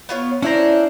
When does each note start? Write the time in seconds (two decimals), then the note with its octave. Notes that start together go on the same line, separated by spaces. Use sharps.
0.09 B3 F4 C#5
0.42 C#4 D4 E4 C5 A#5